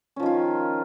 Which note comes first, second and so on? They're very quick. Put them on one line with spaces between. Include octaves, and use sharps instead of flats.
C#4 F3 D#3 F4